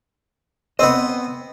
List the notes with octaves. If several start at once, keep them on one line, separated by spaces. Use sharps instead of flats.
B3 C4 D#5